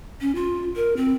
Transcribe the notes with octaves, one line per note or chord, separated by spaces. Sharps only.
C#4
F4
A#4
C4